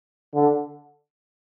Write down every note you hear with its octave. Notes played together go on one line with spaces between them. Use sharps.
D3